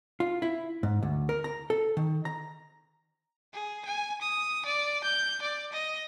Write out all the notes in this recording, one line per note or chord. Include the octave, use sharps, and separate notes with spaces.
F4
E4
G#2
D2
A#4
A#5
A4
D#3
A#5
G#4
G#5
D#6
D5
G6
D5
D#5